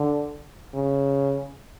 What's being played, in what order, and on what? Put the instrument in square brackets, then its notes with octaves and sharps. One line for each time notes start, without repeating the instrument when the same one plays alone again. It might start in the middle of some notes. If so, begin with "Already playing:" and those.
Already playing: [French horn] D3
C#3